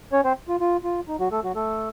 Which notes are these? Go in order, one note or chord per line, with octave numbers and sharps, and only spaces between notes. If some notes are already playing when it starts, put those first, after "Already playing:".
C#4 C#5
C4 C5
F4
F4
F4
D#4
F#3 F#4
A3 A4
F#3 F#4
A3 A4